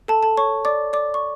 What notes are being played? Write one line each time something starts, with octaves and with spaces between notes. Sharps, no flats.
A4 A5
A4 A5
C#5 C#6
D5 D6
D5 D6
C#6